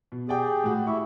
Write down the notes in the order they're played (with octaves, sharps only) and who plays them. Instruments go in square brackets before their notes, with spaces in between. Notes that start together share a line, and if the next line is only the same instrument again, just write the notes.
[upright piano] B2
[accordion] G4 G#4 [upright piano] D5 G5
[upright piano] A2 F#4
[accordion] E4 E5 [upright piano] C#6